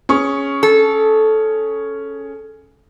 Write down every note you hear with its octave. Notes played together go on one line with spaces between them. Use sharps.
C#4 G#4 C#6
A4